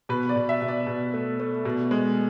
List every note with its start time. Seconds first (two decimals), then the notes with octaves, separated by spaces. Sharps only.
0.09 B2 B4
0.29 D5
0.36 B2
0.49 E5
0.62 B2
0.68 D5
0.87 B2
1.14 A3
1.40 A3
1.65 B2
1.91 G#3